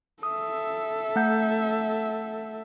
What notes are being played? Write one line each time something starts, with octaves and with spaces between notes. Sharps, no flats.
A4 E5 D#6
A3 F#5 G6